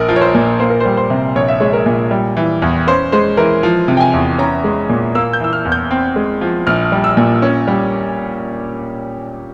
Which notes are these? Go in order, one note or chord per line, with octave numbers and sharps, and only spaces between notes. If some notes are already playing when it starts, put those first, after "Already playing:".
Already playing: A#1 A#4
F3
C#5
C5
A#2
A#3 C5
A#4
C5
G3
C5
C3
A#1 C#5
E5
G#3 C#5
A#4
A#2
G3
E3
E2
C#4 C5
G#3 C5
E3 A#4
F3
C3
G5
G#5
E2
C#4 A#5
G#3
A#2
A#3 E6
G6
E3 E6
F6
E2
G6
C4
G#3
F3
A#1 F6
G3
E6
A#2
C#4
G3